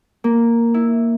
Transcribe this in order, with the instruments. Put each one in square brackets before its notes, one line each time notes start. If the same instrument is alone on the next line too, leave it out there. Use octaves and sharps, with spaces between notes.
[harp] A#3
E4